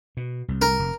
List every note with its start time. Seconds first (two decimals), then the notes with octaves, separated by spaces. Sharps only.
0.17 B2
0.48 C2
0.62 A#4
0.79 F1